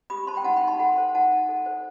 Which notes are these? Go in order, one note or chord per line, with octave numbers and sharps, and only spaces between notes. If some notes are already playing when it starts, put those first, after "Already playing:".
G4 B5 D#6
C5 A5 C6
G5 B5
D#4 F#5 A5
G5 B5
D#4
A5 C6
A4 F#5 A5
C5
D#4 F#5 A5
D#4
A4
C5